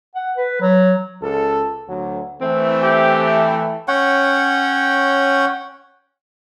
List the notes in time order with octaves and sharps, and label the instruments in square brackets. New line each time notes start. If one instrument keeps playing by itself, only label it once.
[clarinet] F#5
B4
F#3
[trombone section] C#2 A4
D2 F#3
[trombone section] E3 A3 [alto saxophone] C4
[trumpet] G4 [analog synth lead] G5
[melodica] C#4 C#5 F#5 G5